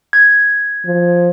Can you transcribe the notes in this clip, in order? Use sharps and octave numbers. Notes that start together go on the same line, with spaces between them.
G#6
F3